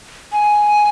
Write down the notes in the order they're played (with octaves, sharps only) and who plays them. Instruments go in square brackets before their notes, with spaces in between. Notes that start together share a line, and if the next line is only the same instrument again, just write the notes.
[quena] G#5